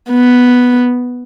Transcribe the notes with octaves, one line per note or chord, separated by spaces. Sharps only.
B3